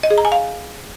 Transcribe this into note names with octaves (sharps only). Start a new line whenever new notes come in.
D#5
G#4
A#5
G#5
F5